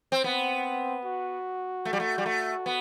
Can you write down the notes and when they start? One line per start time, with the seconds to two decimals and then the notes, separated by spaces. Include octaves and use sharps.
0.12 C4
0.24 B3 C4
1.05 F#4
1.85 A3
1.93 G3
2.00 A3
2.18 G3
2.26 A3
2.66 B3